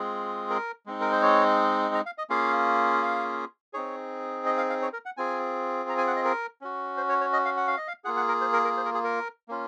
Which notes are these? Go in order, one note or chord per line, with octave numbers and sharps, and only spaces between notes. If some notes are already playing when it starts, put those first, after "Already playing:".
Already playing: G#3 C4 F4 G#4
A#4
G#3 C4 D#4
A#4
C5
C#5
A#5
F5
D#5
A#3 C#4 F4 G#4 F5
F5
C4 D#4 G#4 C#5
D#5
F5
F5
C#5
A#4
F#5
C4 F4 G#4 G#5
A#5
G#5
F#5
D#5
A#4
C#4 F#4
C5
C#5
C#5
D#5
F5
F#5
F5
D#5
F5
A#3 F4 G#4 F#5
F#5
A#4
C5
A#4
A#4
C5
A#4
G#4
A#4
A#3 C#4 F4